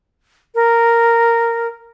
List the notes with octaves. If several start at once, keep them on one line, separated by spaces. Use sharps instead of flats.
A#4